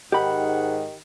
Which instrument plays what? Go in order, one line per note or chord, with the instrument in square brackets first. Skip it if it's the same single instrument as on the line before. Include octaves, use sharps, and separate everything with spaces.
[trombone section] G#2 [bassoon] D#3 [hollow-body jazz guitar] G4 B5 [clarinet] F#5